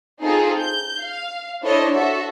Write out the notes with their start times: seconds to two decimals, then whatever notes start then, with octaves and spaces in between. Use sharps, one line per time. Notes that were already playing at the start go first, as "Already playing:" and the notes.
0.23 C4 D#4 F4 G#4 A4
0.59 G6
1.02 F5
1.63 D4 E4 A4 C5 C#5 D#5
1.93 F#4 A4 E5